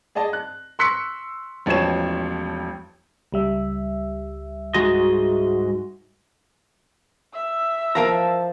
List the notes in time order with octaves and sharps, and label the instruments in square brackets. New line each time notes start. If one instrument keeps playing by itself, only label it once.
[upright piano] G#4 D5 D#5 A5
F#6
C6 C#6 E6 F#6 B6 C#7
E1 A1 F3 C#5 G#6 E7
[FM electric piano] C#2 G3 E5
[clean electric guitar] G#2 G#3 D#5 [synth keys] F#4
[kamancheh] E5 E6
[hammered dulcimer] F3 [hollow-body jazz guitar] A#4 F5 A#5 [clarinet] A5